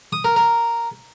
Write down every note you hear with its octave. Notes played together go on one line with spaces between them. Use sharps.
D#6
A#4
A#4